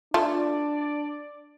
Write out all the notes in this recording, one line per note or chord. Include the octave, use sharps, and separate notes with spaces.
A3 D4 F4 D5